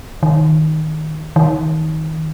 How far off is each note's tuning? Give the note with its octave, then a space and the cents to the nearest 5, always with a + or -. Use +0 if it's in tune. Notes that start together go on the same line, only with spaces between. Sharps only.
D#3 +5
D#3 +25